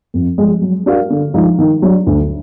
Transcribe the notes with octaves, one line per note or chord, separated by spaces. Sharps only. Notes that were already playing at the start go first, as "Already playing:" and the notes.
F2
F3 G#3
F#3
D4 F#4 A#4 F5
D3
F3 G#3 D#4
D#3
F#3 D4
D2